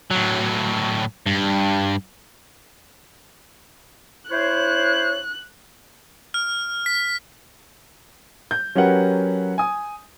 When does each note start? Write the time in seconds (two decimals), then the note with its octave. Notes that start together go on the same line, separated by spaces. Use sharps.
0.11 A2 F#3
1.26 G2
4.31 E4 C5 C#5 F#6
6.34 F6
6.86 B6
8.51 G6
8.75 F#3 C#4 G4 A#4 B4 F#5
9.58 G#5 D#6